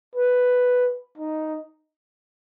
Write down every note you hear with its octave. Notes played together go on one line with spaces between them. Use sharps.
B4
D#4